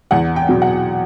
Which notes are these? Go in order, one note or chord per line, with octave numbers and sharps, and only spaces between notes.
E2 F#5
G5
B2 F#3
F#5